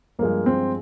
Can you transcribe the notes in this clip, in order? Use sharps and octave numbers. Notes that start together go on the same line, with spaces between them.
G2 F3 G#3 A#3
C4